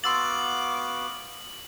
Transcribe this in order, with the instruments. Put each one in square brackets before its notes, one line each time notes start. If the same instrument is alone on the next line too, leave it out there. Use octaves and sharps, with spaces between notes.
[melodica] B3 F#4 F5 [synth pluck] C6 E6 A6 [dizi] D6 [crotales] F#7